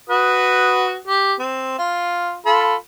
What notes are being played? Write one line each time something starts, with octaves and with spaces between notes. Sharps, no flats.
F#4 B4 D#6
G4
C4
F4
F4 A4 B5